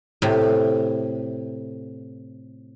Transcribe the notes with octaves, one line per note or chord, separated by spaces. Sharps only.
A2 C3